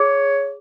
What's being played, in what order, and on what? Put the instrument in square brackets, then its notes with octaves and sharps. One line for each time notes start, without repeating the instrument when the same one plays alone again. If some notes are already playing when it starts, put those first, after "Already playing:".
Already playing: [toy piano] G#4 [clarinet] C#5